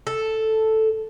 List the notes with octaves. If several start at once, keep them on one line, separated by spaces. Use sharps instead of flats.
A4